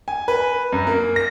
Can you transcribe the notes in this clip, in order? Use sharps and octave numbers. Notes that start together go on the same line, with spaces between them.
G#5
B4
F#2
A#3
A#6